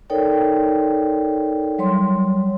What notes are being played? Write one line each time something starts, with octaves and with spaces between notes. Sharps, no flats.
D#4 A4 A#4 C#5 D5 G5
F#3 G3 C#5 C6